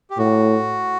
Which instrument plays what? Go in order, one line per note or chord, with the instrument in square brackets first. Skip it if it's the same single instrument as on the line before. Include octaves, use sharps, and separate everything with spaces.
[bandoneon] G4
[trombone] A2 [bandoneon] F#4